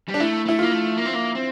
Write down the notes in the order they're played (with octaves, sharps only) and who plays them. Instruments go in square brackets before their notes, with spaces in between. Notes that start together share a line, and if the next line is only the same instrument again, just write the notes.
[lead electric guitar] G3
[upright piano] D4
[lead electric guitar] A3 [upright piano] E4
[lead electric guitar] A3 [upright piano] E4
[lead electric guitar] A#3 [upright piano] F4
[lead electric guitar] A3
A#3
C4
A#3
C4